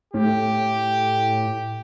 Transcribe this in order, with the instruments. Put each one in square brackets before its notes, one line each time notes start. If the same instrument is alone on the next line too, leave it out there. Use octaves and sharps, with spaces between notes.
[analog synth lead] A2 [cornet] G4